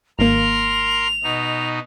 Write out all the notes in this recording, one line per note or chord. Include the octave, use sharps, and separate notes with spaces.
G#1 A#3 A#4 C6 F7
B2 D#4